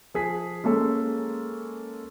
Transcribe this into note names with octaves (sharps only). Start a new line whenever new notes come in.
F3 G#4 B6
G#3 A#3 C#4 A4